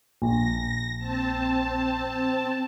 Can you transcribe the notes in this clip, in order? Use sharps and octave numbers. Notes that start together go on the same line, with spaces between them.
A#1 A#6
C4 A5